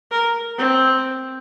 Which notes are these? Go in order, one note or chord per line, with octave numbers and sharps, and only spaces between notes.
A#4
C4